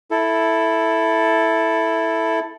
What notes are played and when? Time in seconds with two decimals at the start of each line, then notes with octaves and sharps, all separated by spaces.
0.11 E4 A4